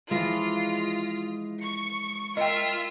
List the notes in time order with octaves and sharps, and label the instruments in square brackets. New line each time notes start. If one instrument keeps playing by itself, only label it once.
[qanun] E3 F3 [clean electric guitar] G#3 [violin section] F4
[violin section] C#6 C#7
[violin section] F4 E5 [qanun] A#4 [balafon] D#5 G5